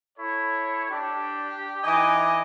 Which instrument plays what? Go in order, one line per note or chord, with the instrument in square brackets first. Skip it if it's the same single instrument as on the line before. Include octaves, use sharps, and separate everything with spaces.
[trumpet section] E4 A4 C#5
[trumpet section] D4 [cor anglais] G4
[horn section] E3 D#5 [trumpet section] D#4 G#5 D6